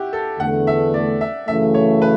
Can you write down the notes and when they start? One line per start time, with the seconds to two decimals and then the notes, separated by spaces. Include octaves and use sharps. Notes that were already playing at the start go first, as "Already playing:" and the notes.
Already playing: E4 F#4 G4
0.13 A4
0.40 E2 D3 A3 F#5
0.67 E5
0.94 D5
1.21 E5
1.48 F#2 C#3 E3 A3 E5
1.74 C#5
2.02 B4